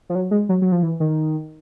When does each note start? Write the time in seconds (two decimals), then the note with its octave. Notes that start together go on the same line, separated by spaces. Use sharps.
0.09 F3
0.15 F#3
0.31 G#3
0.49 F#3
0.62 F#3
0.72 F3
0.83 E3
1.00 D#3